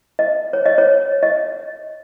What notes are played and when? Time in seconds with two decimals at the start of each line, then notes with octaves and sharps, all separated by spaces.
0.19 D#5
0.53 C#5
0.66 D#5
0.78 C#5
1.23 D#5